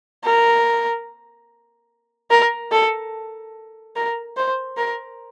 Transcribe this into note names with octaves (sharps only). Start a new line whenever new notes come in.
A#4
A#4
A4
A#4
C5
A#4